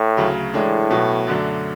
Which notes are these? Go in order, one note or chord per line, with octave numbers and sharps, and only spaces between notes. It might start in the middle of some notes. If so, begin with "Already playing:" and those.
Already playing: A2
D2 C#3 F#3
A2 E3 G#3 D4
B2 F#3 B3
F#2 D3 F#3 A3 D4